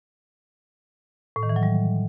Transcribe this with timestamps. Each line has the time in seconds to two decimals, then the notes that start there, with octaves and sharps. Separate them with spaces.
1.36 A2
1.43 D#3
1.49 E3
1.56 F#3
1.63 G3